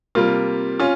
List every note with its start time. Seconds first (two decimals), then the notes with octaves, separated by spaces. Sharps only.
0.15 C3 G3 A#3 F4
0.80 C#4 F4